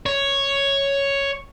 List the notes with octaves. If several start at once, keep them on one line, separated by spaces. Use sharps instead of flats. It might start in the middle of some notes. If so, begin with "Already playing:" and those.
C#5